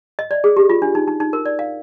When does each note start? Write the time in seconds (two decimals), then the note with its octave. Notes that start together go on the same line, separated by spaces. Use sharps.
0.19 D#5
0.31 D5
0.44 G#4
0.57 G4
0.70 F4
0.82 D4
0.95 D#4
1.08 D#4
1.20 D#4
1.33 A#4
1.46 D5
1.59 F5